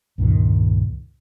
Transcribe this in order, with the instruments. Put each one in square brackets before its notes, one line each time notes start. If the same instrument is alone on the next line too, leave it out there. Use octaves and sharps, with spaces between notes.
[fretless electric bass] C#2 G2 A#2 D#3